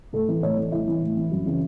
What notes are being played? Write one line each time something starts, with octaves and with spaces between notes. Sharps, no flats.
A2 A4
E3
A2 C#5
E3
A2 E4
E3
A2
E3
F#2
C#3 E3